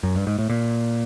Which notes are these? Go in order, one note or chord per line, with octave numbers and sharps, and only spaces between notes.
F#2
G2
G#2
A2
A#2